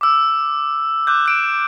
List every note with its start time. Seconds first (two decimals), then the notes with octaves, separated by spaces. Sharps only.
0.01 D6 E6
1.07 D6 F#6 G6
1.26 F#6 D7 E7